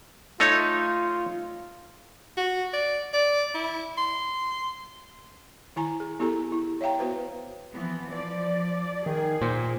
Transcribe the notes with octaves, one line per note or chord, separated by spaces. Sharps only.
A3 D#4 F4 C#5
F#4
D5
D5
E4
C6
D#3 E4 G#5 A#5
G#4
B3 E4 G4 A4 A#5
E4
C#5 E5 F5 G5 A#5
B3 F#4 B4 C5
E3 F3 B3
F3 D5
D#3 G#4
A#2 C5